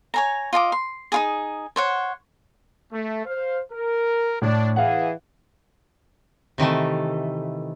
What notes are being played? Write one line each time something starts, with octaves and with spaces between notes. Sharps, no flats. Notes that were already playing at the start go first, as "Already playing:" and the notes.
C#5 G#5 A#5
F4 D#5 A5 D6
C6
D#4 F4 G#4
C5 C#5 F#5
A3
C5 F5
A#4
A2 D4
E3 G#4 F5 F#5
C3 D#3 E3 A3